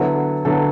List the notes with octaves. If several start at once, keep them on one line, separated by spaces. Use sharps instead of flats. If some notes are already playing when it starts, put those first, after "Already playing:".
Already playing: D3 F#3 B3 E4 A4
D3 F#3 B3 E4 A4